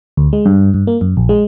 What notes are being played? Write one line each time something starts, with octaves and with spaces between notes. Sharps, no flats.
D2
G#3
G2
G2
A#3
F#2
A#1
G#3